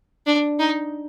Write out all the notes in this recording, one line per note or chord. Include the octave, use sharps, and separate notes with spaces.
D4
D#4